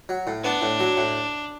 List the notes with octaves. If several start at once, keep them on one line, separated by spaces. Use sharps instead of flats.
F#3
A2
B3 D4
A2
F#3
A2